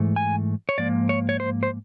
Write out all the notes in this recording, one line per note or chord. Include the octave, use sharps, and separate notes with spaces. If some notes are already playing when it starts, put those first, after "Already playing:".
Already playing: G#2 E3 A3
G#5
C#5
G#2 F3 A#3 D5
C#5
C#5
C5
C5